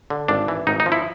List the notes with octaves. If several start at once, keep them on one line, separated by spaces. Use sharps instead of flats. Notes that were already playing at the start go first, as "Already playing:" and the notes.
D3
G#1 D4
E3
G#1 D#4
D#4
F3
E4